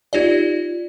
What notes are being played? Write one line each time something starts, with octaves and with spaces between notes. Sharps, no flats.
D#4 F4 G4 D5